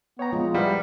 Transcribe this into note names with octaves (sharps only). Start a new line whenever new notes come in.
B3 C#5 G5 A#5
F3 G#3 F4
G3 E4 B4 F5 F#5